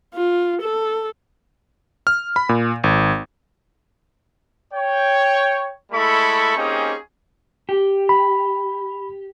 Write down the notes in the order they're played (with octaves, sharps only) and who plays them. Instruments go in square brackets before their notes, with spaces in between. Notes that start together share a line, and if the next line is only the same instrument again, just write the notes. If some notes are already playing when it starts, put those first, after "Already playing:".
[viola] F4
A4
[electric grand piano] F6
B5
A#2
G#1
[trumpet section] C#5 G5
G#3 A3 E4 A4 B5 C#6
A#3 C4 C#4 D#4 G4 G#4
[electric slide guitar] G4
[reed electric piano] B5